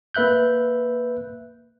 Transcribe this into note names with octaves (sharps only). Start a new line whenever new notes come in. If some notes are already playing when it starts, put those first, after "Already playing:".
A#3 B4 E5 F#6 G6